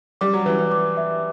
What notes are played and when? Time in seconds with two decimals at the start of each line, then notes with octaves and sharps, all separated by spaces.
0.21 G3 D6
0.33 F#3
0.45 E3 B4
0.59 E3
0.72 D6
0.97 E5